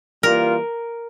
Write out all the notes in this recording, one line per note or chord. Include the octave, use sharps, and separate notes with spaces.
E3 G3 A#3 F4 A#4